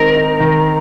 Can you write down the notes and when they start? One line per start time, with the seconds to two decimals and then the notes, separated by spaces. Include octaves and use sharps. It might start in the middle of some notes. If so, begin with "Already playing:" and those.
Already playing: D#3 G#3 C4 D#4 A#4
0.15 D#4
0.40 D#3